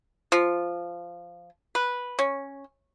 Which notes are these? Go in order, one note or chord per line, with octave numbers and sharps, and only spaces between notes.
F3
B4
C#4